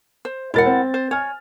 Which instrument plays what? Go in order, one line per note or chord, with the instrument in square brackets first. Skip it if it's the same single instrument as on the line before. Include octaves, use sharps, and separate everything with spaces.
[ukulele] C5
[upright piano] E1 A6 [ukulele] E4 A#4 F#5
[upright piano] C4
[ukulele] C5
[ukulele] C#5 [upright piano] G#5 F6